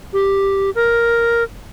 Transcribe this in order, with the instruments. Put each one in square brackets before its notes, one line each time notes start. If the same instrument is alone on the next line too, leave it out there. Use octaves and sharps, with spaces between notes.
[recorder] G4
A#4